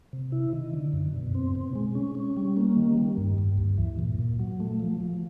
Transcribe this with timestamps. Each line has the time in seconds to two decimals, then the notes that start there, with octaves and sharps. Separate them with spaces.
0.13 C3
0.32 E4
0.53 D#3
0.73 D3
0.93 F#2
1.14 B2
1.35 C4
1.55 B2
1.75 G#3
1.95 C#4
2.15 C#4
2.37 G3
2.57 A#3
2.77 D#3
2.98 G3
3.17 G2
3.38 G2
3.58 D2
3.78 E3
3.99 A#2
4.19 A#2
4.39 F#3
4.60 A3
4.79 F3
5.01 F3